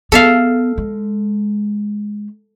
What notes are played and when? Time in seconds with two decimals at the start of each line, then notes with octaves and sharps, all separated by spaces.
0.12 B3 A4 E5 F5
0.78 G#3